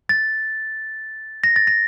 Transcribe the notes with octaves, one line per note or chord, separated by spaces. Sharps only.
A6
A#6
A6
A#6